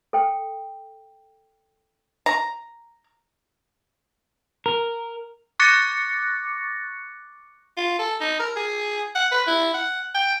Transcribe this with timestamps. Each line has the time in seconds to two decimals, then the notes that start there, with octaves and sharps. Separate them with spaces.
0.13 A4 G5
2.26 A#5
4.66 A#4
5.59 C#6 D6 F#6 A6 A#6 C#7
7.77 F4
7.99 A4
8.21 D#4
8.40 A#4
8.56 G#4
9.15 F#5
9.32 B4
9.47 E4
9.74 F#5
10.15 G5